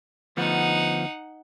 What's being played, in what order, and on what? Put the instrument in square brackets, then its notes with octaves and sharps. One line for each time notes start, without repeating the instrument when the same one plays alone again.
[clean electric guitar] D2 F3 B3 [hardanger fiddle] D#4 F#5